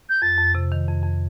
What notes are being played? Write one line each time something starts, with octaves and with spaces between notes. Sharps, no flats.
G6
F2 A6
F2
C3
D#3
F2
F2